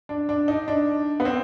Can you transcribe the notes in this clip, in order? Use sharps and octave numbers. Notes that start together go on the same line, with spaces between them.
D4
D4
D#4
D4
B3
C4